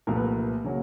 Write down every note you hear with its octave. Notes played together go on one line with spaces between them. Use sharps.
C2 A#2 F3 A3 A#4
B4
A#4
C#3 F#3 A#3 C#4